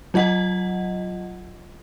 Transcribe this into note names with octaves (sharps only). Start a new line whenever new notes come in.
F#3 F4 D#5 F#5